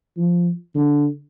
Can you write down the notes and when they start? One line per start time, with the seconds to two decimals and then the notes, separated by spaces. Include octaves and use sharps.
0.17 F3
0.75 D3